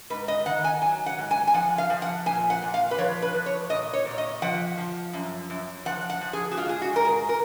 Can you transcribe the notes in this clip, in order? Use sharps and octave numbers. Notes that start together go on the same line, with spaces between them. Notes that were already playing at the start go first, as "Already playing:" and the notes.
G#2 B4
D#5
D#3 F#5
G#5
F#3 G#5
F#5
G#2
G#5
G#5
F3 F#5
F5
F3
F#5
A#2 G#5
F#5
A#2
F5
B4
F3 C#5
B4
F3
C#5
A#2 D#5
C#5
A#2
C#5
D#5
F3 F#5
F3
F#2
F#2
F3 F#5
F#5
F3
G#4
F#4
G#2 F4
G#4
F#4
G#2 A#4
G#4
A#4